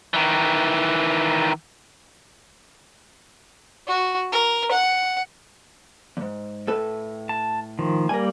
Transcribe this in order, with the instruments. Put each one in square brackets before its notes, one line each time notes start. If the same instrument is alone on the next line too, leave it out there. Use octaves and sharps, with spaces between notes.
[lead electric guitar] D#3 E3
[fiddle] F#4
A#4
F#5
[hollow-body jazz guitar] E2 G#2
A2 A4 B4
[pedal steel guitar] A5
D#3 F3
[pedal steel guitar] G3 A#3 [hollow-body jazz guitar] A#4 G#5